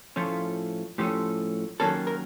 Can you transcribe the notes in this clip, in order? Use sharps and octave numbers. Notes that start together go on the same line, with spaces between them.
A2 F3 A3 C#4 F4
A2 F3 A3 C#4 G4
D#2 D#3 F#3 A#3 C#4 A4
A#4